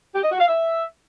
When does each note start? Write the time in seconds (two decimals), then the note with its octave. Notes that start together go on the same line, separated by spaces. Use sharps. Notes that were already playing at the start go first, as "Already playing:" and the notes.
0.15 G4
0.23 D#5
0.32 F#4
0.40 F5
0.48 E5